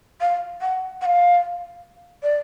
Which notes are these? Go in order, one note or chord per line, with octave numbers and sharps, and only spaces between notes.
F5
F#5
F#5
F5
D5